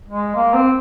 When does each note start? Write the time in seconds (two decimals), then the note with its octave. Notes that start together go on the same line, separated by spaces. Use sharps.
0.08 G#3
0.35 A#3
0.53 C4